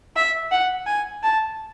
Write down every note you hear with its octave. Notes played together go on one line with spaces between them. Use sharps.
E5
F#5
G#5
A5